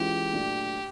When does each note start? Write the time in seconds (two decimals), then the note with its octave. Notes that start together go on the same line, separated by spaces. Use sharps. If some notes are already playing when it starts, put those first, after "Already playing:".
Already playing: E3 G#3 C#4 F4 G4
0.33 A#2 F#3 A3 D4